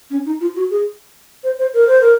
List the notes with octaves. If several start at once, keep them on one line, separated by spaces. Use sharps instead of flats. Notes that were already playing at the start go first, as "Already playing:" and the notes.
C#4
D#4
F4
F#4
G#4
C5
C5
A#4
C5
A#4